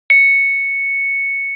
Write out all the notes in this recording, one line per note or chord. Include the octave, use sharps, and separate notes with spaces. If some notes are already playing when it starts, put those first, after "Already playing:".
C#7